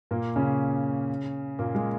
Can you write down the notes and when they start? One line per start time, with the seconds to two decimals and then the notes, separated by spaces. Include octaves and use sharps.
0.11 A#2 A#3
0.36 C#3 C#4
1.59 A#2 A#3
1.75 G#3